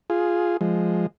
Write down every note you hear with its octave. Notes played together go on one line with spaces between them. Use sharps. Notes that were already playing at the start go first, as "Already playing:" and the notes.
F4 G#4
F3 G#3